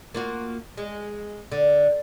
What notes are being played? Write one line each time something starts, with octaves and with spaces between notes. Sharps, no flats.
A#3 F4 F#4
G#3
D3